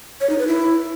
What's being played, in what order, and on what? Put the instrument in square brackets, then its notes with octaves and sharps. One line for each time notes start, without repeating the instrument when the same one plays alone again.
[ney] C#5
D#4
B4
E4